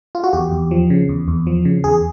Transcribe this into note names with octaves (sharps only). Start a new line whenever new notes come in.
F4
F#4
E2 G4
E2
F3
C#3
E2
E2
F3
C#3
E2 G#4